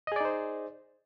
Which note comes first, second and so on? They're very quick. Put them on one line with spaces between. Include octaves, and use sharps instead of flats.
D#5 G#4 D5 D#4 C5